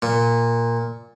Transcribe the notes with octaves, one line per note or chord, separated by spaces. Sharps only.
A#2